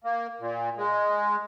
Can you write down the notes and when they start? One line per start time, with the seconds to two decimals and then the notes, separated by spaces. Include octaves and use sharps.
0.04 A#3
0.40 A#2
0.77 G#3